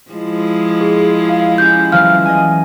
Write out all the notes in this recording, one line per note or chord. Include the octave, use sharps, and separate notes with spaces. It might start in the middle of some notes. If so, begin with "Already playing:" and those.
F3 G#3 E4
G#4
F5
C#4 G4 G6
E3 F#3 G3 F5 F6
D#5 G#5